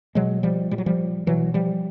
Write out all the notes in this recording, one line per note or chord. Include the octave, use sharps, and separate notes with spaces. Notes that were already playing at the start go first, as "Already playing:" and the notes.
B2 F#3 G#3
F3 G3
A#2 G3
F#3
F3 G3
B2 E3 F#3
F3 G3